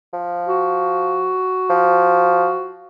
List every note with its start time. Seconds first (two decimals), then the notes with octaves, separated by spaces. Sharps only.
0.13 F3
0.47 F#4
1.70 F3